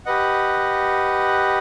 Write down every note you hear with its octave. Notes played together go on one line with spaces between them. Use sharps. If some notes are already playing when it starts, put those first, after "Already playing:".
G4 B4 D#5 F#5